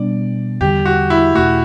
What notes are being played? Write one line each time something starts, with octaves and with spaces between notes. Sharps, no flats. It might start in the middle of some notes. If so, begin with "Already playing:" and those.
Already playing: B2 G3 B3 D4 D5
E2 D3 G3 G4
F#4
E4
E2 B2 A3 F#4